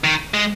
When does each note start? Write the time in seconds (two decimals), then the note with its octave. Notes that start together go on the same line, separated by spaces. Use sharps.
0.04 D#3
0.34 G#3